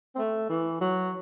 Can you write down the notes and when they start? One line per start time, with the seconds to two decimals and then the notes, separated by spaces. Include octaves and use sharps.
0.15 C4
0.19 A3
0.49 E3
0.81 F#3